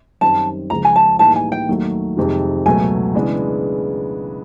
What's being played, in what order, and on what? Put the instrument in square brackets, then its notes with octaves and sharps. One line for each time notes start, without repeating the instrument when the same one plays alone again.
[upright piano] F#2 D#3 G3 C4 [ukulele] A5
[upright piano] C#2 C#3 F3 [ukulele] A#5
[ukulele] G#5
A5
[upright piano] A2 E3 G3 A#3 D#4 [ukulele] A5
[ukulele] G#5
G5
[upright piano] D#2 D#3 F#3 A3
F2 C3 D#3 G#3
[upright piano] C#2 B2 F#3 A3 [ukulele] G#5
[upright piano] C#3 E3 G#3 B3 D4